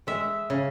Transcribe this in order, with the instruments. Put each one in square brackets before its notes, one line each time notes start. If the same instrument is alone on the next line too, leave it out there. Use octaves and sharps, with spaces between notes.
[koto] G#3 E5
C#3